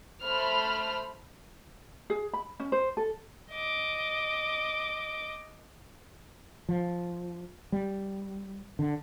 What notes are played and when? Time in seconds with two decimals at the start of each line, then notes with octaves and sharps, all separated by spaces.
0.22 A3 C5 B5 F6
2.10 G#4
2.33 B5
2.60 C#4
2.72 C5
2.97 A4
3.51 D#5 D6
6.69 F3
7.72 G3
8.79 D3